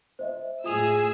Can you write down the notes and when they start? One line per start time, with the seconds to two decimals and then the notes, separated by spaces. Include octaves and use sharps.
0.19 C5 D#5 E5
0.64 A2 F4 G#4 D#6 E6 F7